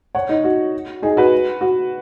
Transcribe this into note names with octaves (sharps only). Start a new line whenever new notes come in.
C#5 F#5
D#4
F#4
D#4 G#4
F#4 B4
F#4